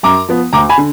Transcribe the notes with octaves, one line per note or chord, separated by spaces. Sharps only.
F#2 A#5 D6
F3 B3
D2 A#5 D6
G#5 B5
D3